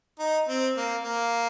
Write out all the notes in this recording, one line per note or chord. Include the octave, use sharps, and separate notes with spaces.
D#4
C4
A#3
A#3